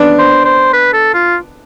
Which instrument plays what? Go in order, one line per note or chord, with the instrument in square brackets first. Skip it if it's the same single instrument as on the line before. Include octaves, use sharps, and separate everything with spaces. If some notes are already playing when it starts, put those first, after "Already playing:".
Already playing: [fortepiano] B3 D4
[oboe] C5
C5
B4
A4
F4